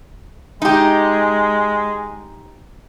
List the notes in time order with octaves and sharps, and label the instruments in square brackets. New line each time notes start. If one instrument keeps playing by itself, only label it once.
[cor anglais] G#3 [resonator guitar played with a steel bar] D#4 G4